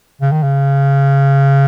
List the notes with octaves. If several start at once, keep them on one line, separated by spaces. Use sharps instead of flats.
C#3
D#3
C#3